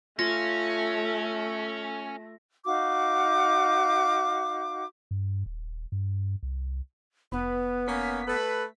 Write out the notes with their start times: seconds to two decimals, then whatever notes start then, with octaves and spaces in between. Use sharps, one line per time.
0.19 A3 C#4 F4 A#6
2.65 D#4 F#4 F5 D6
5.11 G2
5.46 D#1
5.92 G2
6.43 C2
7.32 F1 B3 B4
7.88 A#3 C#4 B6
8.28 A3 A4 B4